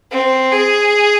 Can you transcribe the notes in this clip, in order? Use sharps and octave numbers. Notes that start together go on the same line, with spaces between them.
C4
G#4